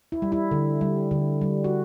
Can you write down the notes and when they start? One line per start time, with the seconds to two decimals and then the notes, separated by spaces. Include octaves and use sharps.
0.12 E4
0.22 G3
0.32 E4
0.51 D3
0.81 G3
1.11 D3
1.41 G3
1.64 F#4